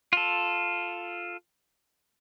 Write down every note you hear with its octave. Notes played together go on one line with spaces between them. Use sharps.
F4 A4